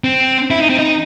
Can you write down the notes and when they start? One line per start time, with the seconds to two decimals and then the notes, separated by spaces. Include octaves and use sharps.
0.04 C4
0.50 E4
0.60 D#4
0.70 C4
0.79 D#4